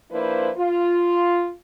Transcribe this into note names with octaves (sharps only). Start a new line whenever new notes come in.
F3 A#3 D4 E4 B4 C5
F4